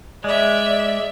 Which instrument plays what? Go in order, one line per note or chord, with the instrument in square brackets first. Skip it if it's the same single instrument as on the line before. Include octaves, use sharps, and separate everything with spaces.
[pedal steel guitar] G#3 [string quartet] D5 E5